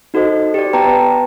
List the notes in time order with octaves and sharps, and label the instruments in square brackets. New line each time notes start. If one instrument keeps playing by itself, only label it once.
[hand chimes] D#4 F#4 A4 C5 D#5
G4 D5
B3 B4 G5 A5 A#5